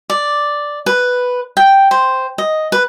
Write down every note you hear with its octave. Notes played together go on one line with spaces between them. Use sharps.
D5
B4
G5
C5
D#5
B4